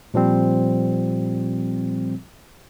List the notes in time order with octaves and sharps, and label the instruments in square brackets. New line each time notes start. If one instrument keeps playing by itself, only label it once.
[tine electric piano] A#2 F3 G3 C4